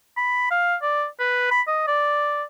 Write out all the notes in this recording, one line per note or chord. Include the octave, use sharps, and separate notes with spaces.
B5
F5
D5
B4
B5
D#5
D5